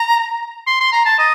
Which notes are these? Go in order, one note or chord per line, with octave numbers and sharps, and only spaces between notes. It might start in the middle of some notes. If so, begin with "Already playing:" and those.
Already playing: A#5
C6
C6
A#5
A5
D#5